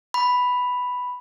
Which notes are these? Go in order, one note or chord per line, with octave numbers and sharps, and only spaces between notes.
B5